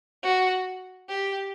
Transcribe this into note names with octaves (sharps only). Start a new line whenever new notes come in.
F#4
G4